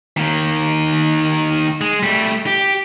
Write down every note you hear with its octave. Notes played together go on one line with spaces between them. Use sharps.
D#3 A#3
G#3
G3 A3
G4